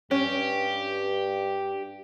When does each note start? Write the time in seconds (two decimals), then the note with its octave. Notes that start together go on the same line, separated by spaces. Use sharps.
0.11 G2 C#4 G4